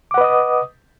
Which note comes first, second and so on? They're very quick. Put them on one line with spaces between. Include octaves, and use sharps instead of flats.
D6 F#5 B4 D#5 D#6